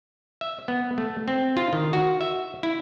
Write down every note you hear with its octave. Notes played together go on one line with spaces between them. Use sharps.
E5
B3
A3
C4
F4
D#3
F#4
E5
E4